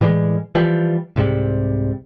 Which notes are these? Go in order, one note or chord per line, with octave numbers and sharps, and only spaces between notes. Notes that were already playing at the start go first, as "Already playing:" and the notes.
A2 E3 G3 G#3
E3 F3 G3
C2 G#2 C3 G3